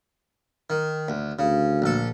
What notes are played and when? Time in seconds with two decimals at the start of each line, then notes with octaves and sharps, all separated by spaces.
0.70 D#3
1.08 D2
1.39 D2 C#3
1.82 A#1 A4